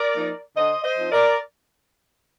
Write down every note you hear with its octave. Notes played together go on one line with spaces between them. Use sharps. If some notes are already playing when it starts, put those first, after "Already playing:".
Already playing: A#4 D5
F3 A#3 D#4
D3 C5 D#5
C5 D#5
F3 C4 D#4
A#4 D5